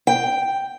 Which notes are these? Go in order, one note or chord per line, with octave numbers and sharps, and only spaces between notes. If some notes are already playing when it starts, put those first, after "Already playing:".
G5